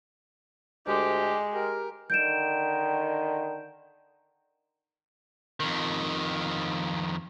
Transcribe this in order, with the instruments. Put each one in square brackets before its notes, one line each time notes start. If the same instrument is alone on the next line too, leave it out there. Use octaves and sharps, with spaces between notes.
[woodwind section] D2 G4 [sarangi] G#3
[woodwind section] G4 A#4
[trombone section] D3 D#3 [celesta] G6 D7 E7
[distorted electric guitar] F2 D#3